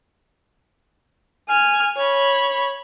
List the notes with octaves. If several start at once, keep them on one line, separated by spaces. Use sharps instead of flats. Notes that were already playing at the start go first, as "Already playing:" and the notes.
G#5 F6
C#5 B5